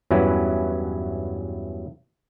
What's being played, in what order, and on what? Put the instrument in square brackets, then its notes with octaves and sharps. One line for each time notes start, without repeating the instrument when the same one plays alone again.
[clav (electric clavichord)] E2 G2 F#3 C#4 E4 B4